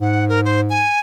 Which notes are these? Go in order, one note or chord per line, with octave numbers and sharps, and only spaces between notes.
G#2 F#5
A#4
C5
G#5